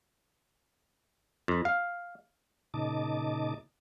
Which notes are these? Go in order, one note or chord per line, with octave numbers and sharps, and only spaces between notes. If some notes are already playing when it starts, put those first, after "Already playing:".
F2
F5
A#2 C#3 D#4 D#5 A5 D6